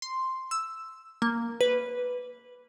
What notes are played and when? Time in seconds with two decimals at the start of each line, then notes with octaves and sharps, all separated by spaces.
0.02 C6
0.51 E6
1.22 A#3
1.61 B4